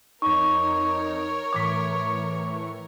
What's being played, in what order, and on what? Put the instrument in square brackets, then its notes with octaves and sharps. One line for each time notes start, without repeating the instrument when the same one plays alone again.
[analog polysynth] F2 D#4 [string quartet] A#4 C#5 [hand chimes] C#6
[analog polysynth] A2 E3 C#6 [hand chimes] D6 B6